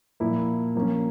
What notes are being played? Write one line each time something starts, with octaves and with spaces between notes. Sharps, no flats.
A#2 F3 A#3 E4
F3 A#3 C#4